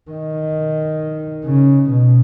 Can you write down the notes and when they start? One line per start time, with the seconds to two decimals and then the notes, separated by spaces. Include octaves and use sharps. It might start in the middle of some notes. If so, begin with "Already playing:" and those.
0.11 D#3
1.46 C#3
1.91 B2